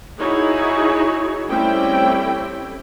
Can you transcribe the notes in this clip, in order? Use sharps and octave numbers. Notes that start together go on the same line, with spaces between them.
D#4 E4 F#4 G#4 C#5
G3 A3 C4 C#4 E4 G5